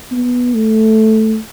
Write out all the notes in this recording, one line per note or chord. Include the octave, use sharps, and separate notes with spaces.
B3
A3